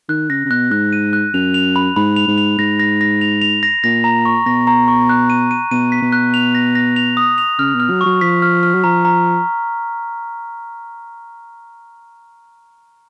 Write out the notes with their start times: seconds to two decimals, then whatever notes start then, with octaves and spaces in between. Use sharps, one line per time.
0.09 D#3 F#6
0.30 C#3 A#6
0.45 C#3
0.50 B2 F#6
0.71 G#2 F#6
0.93 D#7
1.13 F#6
1.34 F#2 F7
1.54 F7
1.76 B5
1.96 G#2 B5
2.16 F7
2.28 G#2
2.38 F7
2.59 G#2 A#6
2.80 A#6
3.01 A#6
3.21 F7
3.42 F7
3.63 A#6
3.84 A#2 A#6
4.04 A#5
4.25 C#6
4.46 B2 A#6
4.67 A#5
4.88 C#6
5.09 F#6
5.30 D#7
5.51 D#7
5.71 B2 D#7
5.92 B6
6.02 B2
6.13 F#6
6.34 F7
6.55 A#6
6.75 A#6
6.96 F7
7.17 D#6
7.38 F7
7.59 C#3 F6
7.74 B2
7.80 F6
7.90 F#3
8.01 F#3 C#6
8.21 F3 B6
8.42 F6
8.63 F6
8.75 F#3
8.84 F3 A#5
9.05 A#5